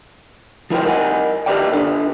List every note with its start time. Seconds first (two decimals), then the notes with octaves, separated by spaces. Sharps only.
0.70 F3 E4 A#4 C5 G5
0.86 A#4 D#5 F#5 G#5
1.46 G4 A#4 B4 D5 D#5 G5
1.73 D4 A4 B4